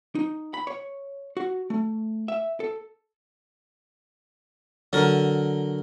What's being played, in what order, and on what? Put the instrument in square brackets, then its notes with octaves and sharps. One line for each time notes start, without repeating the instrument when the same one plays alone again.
[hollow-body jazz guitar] D#4
B5
C#5
F#4
A3
E5
A4
[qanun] D3 [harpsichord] F#3 A#4